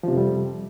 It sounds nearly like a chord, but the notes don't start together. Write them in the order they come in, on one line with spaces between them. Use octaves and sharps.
F3 C3 F2 G3